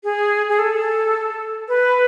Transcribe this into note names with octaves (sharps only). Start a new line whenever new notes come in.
G#4
G#4
A4
B4